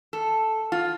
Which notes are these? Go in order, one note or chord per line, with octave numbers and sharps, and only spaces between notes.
A4
F4